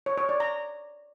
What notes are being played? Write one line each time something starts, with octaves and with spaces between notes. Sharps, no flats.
C#5
C#5
D5
A#5